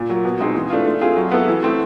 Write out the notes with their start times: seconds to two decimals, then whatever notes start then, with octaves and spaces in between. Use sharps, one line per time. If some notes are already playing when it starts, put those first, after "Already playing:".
Already playing: A#2
0.10 F#3 A#3
0.25 B2
0.40 G#3 C4 D#4 G#4
0.55 E3
0.70 A3 D4 F4
0.86 A3
1.01 C4 F4 G#4
1.17 F#3
1.31 B3 E4 A4
1.48 E3
1.63 A3 C4